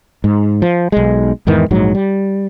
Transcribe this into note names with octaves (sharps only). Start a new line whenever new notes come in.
G#2
F3
B1 G#3
E2 G#2 D#3 E3
A#1 G#2 F#3
G3